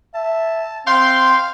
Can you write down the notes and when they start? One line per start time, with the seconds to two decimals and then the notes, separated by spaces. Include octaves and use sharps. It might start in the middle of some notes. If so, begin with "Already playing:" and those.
0.15 E5 A5
0.87 C4 F5 G5 C6